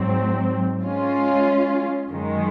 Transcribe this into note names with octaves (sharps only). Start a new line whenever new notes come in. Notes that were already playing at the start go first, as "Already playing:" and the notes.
Already playing: G#2 F#3 C4
G#3 C#4 F4
F#2 D#3 G#3